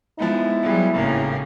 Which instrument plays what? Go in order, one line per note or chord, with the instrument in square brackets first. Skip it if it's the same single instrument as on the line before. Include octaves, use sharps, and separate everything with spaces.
[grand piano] F3 B3 D#4 [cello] G#3 [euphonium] E4
[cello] F#3 G3 [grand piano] B3 F4 G#4
[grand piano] G#1 A2 [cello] C#3 A#3